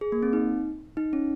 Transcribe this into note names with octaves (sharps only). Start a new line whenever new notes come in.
G#4
A#3
C4
D#4
D#4
C#4